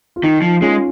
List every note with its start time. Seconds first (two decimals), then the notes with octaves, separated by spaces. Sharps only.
0.16 F4
0.23 D#3 D#4
0.42 F3
0.61 G#3 C#4 F4